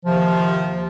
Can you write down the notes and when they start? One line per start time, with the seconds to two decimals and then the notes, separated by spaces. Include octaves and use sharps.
0.06 D#2 C3 D#3 F3